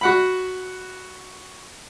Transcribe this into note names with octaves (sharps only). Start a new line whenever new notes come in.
F#4 F#5 B5